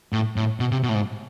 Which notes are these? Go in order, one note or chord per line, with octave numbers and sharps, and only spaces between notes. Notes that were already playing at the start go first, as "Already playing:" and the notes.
A2
A2
B2
C3
B2
A2
G#2